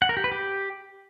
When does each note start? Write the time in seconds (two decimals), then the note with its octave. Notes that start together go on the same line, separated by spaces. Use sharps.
0.02 F#5
0.09 A#4
0.17 G4
0.24 B4
0.32 G4